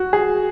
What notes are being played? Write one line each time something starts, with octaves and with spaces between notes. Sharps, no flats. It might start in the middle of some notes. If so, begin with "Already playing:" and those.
Already playing: F#4
G#4